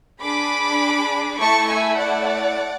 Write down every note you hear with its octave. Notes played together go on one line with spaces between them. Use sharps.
D4 G#4 B5 D6
A3 E4 A4 A5 C#6
E5 G#5
D5 F#5